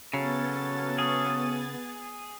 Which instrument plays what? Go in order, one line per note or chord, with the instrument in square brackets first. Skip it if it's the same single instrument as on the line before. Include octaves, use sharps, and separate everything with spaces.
[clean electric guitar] C#3 [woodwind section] F#3 C#4 A4 [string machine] B3 A6
[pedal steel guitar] G#4